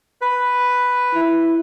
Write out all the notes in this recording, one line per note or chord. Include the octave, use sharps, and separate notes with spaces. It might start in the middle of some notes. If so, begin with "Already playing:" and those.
B4
E4